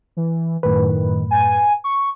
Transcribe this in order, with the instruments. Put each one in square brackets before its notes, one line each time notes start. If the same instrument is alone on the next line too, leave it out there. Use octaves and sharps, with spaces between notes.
[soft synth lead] E3
[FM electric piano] F#2 A2 B4 [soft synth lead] D#3
[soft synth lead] G#5
C#6